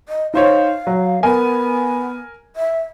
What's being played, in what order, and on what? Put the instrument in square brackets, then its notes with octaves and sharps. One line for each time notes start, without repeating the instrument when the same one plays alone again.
[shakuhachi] D#5
[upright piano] D#4 C5 C#5 [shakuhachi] F5
[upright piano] F#3
[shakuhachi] B3 [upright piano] A#4 G#5
[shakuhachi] E5